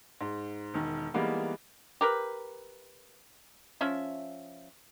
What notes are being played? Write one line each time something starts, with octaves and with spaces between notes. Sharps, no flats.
G#2
E1 D#3
E3 G3 G#3 A#3 B3 D#4
G4 A#4 B4
F3 C#4 E5